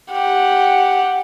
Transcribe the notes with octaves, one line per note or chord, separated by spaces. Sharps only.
G4 F#5